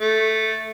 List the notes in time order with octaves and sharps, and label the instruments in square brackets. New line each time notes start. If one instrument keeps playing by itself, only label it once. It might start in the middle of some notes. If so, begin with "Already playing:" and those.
[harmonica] A3